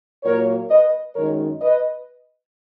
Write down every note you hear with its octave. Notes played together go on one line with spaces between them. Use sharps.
A#2 F#3 A#3 A#4 C#5
B4 D#5
F#2 D#3 G#3 A#4 C#5
B4 D#5